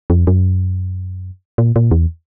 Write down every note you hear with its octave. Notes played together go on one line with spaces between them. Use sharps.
F2
F#2
A#2
A#2
E2